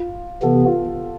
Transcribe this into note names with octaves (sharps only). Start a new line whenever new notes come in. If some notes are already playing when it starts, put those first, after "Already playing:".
Already playing: F4
C3 E3 B3 A4
G4
F4